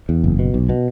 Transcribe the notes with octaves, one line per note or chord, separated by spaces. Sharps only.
E2
F#1
B2
B1
B2